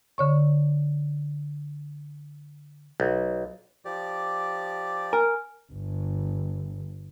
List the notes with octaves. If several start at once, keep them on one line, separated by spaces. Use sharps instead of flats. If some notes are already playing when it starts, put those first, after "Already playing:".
D3 C#5 C#6
B1
F3 G4 D5
A#4 G#5 F6
G1